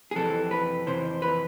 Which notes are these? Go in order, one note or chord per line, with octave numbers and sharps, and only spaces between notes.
G#4
F2 C3 E3 A4
B4
F2 C3 E3 C5
B4